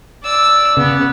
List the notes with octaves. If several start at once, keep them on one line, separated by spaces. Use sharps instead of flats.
D5 E6
C#3 B3